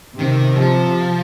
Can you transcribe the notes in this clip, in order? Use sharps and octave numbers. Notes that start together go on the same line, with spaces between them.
C3 D#3
C3 F3